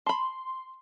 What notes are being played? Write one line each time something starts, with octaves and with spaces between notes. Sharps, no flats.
A5 B5 C6